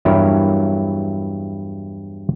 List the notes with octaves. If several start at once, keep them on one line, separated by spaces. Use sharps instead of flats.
E2 G2 F#3 E4 A#4 C#5